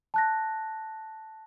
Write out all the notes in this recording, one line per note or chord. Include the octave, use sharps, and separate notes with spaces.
A5 F#6 A#6